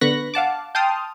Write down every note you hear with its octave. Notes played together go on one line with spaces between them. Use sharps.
D3 B3 B5 C#6 F#6 A#6
F5 F#5 A5 D6
G5 A5 C6 D#6 F6